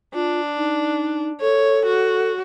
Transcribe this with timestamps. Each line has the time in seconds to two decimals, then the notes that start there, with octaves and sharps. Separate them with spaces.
0.15 D4 F4
0.57 D#4
1.41 A4 C#5
1.86 F#4